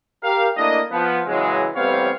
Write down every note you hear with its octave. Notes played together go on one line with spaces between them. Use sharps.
G4 A#4 F5
A3 A#3 D4 E4 D#5
F3 B3
C#3 E3 F#3 G#3
A1 G3 B3 C4 C#5 F5